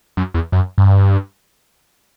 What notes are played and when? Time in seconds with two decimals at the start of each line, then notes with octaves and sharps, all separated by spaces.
0.17 F#2
0.34 E2
0.52 F#2
0.78 G2